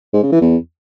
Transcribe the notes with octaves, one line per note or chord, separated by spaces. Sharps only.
G#2
C#3
E3
E2